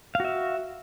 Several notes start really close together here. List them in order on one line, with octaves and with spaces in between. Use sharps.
F5 F#4 E5